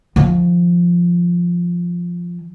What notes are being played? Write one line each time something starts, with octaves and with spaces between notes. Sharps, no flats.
D#3 F3